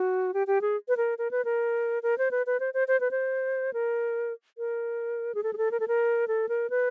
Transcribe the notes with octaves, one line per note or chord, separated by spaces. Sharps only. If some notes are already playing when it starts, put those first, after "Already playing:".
Already playing: F#4
G4
G4
G#4
B4
A#4
A#4
B4
A#4
A#4
C5
B4
B4
C5
C5
C5
B4
C5
A#4
A#4
G#4
A4
G#4
A4
A#4
A4
A#4
A4
A#4
B4